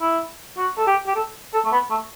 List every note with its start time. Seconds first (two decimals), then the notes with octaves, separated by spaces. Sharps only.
0.01 E4
0.58 F#4
0.77 A4
0.87 G4
1.07 G4
1.15 A4
1.53 A4
1.65 A3
1.72 B3
1.90 A3